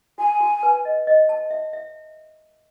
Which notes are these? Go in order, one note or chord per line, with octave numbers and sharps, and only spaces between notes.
F#4 G#5
F#4
B4
D#5
D#5
A5
E5
E5